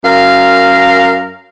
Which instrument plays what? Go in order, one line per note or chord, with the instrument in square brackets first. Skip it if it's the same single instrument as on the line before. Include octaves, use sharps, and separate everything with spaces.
[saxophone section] F#2 A#4 F5